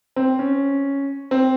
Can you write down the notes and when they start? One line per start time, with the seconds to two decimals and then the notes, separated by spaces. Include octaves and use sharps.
0.16 C4
0.39 C#4
1.31 C4